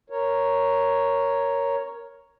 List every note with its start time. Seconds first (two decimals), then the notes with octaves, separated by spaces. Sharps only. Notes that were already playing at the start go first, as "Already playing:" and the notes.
0.10 A#4 C#5